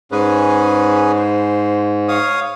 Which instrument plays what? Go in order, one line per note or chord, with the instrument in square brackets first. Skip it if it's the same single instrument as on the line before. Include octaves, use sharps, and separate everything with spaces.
[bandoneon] G#2 [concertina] C#4 G#4 B4
[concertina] C5
C#5 F5 D#6